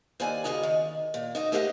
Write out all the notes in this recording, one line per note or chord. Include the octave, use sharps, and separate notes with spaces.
D#2 C5 D5 G#5
D#2 G#2 C#3 F#4 D#5 A#5
D#3
A#2
D#4 F#4 D#5
A3 G4 A#4 C5 D#5 F#5